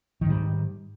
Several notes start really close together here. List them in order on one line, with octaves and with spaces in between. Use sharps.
D#3 G#2 G3